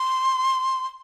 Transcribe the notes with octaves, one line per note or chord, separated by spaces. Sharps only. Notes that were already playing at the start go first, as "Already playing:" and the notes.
Already playing: C6